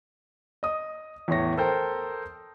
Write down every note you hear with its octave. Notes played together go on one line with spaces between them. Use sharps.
D#5 D#6
E2 A2 C#5 C#6 A#6
A4 A#4 C5 G5